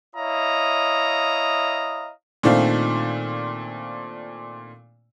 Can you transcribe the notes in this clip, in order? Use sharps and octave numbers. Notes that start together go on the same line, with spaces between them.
E4 C#5 D#5 F5 A#5 D#6
A#2 D#3 A3 C4 D4 F4